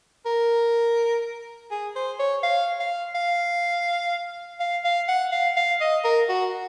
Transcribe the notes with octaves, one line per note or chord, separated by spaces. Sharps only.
A#4
G#4
C5
C#5
F5
F5
F5
F5
F5
F#5
F5
F5
D#5
A#4
F#4